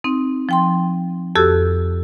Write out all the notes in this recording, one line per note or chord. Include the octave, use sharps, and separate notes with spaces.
C4 D#4
F3 G5 C6
F2 F#4 G4 A4 E6